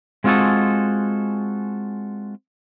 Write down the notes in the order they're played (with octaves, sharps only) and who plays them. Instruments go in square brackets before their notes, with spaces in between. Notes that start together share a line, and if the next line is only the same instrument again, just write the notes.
[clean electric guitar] G#3 C4 F4 F#4 G#4 A4